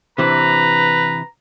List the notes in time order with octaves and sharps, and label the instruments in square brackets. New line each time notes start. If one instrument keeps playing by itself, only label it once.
[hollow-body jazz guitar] C3 E3 D4 [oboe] B4 [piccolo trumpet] A#5